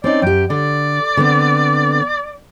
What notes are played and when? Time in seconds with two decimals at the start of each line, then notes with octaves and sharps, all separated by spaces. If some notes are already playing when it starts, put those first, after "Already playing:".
0.04 C4 C#4 D#4 D5
0.22 F#2 G4 G5
0.50 D3 D5
1.17 D3 B3 C4